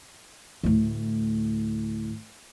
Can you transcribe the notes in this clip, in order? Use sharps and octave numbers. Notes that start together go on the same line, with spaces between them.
D2 A2